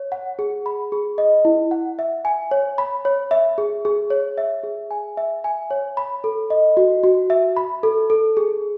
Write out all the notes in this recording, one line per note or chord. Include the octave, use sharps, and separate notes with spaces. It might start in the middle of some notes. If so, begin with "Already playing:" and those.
Already playing: C#5
F#5
G#4
B5
G#4
D#5
E4
F#5
E5
G#5
C#5
B5
C#5
E5
G#4
G#4
C#5
E5
G#4
G#5
E5
G#5
C#5
B5
A4
D#5
F#4
F#4
E5
B5
A4
A4
G#4